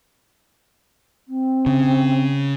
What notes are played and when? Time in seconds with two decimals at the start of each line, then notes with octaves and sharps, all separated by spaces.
1.28 C4
1.66 C#3